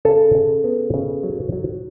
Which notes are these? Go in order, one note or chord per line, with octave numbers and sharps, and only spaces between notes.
C#3 A4
C#3
B3
C#3
F#3
F#3